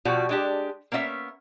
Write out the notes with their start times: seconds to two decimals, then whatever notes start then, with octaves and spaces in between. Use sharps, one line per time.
0.05 B2 F3 G3 F#4
0.29 G#3 D4 G4
0.92 A#3 B3 C#4 D#5 E5